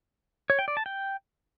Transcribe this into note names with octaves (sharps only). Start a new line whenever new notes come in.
C#5
G5
D5
A5
G5